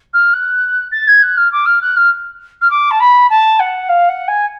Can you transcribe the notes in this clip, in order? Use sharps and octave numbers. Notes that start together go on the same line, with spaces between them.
F6
F#6
A6
G#6
F#6
F6
D6
F6
F#6
F6
F6
D6
A5
B5
A5
F#5
F5
F#5
G#5